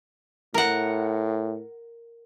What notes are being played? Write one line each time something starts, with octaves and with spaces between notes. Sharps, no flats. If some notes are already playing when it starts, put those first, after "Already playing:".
A2 A#4 F#5